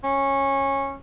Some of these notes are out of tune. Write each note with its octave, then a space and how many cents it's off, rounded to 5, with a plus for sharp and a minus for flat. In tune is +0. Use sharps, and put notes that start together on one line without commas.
C#4 -15